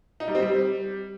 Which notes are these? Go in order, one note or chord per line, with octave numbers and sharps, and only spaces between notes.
D#4
G3
C4
G3